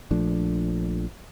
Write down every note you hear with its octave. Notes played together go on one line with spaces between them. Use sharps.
A#1 F3 A3 D4